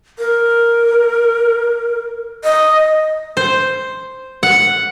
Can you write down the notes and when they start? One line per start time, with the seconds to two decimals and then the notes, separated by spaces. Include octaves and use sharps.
0.19 A#4
2.44 D#5
3.37 C5
4.43 F#5